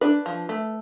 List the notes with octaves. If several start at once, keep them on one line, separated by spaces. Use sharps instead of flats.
D4 B4
F3
A3